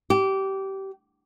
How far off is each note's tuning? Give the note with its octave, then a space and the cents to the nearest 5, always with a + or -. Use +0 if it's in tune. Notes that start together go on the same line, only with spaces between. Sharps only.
G4 -20